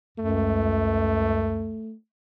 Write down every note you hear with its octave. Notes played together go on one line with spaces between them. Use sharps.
C#2 F#2 A3